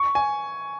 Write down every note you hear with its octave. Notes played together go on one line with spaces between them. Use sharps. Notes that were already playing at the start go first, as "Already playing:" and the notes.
Already playing: C#6
G#5